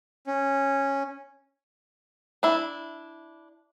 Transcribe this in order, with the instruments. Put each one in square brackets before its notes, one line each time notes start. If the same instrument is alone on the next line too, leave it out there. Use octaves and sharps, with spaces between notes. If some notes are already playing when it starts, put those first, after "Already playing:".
[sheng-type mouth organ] C#4
[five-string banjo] D4 E4